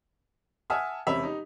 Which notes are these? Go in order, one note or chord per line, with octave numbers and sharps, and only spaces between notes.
E5 F#5 G#5 A5 D#6 F6
E1 C3 C#4 E5 B5 F7
D#4 G4